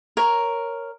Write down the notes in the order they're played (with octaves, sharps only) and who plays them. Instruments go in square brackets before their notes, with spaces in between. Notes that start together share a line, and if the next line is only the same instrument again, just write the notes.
[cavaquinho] A#4 C#5